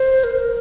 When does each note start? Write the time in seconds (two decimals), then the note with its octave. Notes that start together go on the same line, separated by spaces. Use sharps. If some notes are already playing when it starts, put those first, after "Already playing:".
Already playing: C5
0.24 A#4
0.31 C5
0.39 A#4